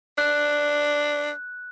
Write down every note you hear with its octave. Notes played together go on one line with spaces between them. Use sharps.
D4 F#6